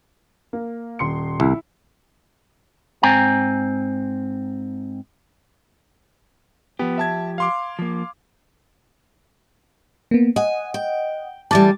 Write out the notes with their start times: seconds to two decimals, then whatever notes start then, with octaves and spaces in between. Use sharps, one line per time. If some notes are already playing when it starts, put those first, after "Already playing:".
0.53 A#3
0.99 D#1 C6 C#7
1.40 C2 E4
3.03 G#2 C4 G5 G#5 A#5
6.79 F3 B3 G4
6.98 E5 A5 G#6
7.38 F5 C6 D6
7.79 F3 A#3
10.11 A#3 B3
10.36 D#5 F#5 G#5
10.74 G5
11.51 A2 E3 G3 A5 D6 A6